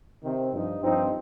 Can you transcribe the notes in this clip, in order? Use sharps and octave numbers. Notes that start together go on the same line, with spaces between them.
C3 D#3 C4
G2 F3 D#4
G2 F3 C4 D#4